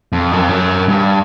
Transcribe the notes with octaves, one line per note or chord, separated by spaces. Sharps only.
F2
F#2
F2
F#2
G2